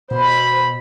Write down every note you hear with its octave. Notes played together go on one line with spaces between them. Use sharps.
B2 C5 B5